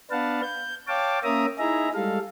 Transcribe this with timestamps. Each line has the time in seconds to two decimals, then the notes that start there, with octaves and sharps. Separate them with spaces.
0.11 B3 D4 B4 F5 F#5 A5
0.43 G6
0.88 C#5 F5 G5 A5 D6
1.24 A#3 C#4 E5 A#5 D#6
1.59 D#4 E4 G#4 E5 A#5
1.95 G3 G#3 A4 F5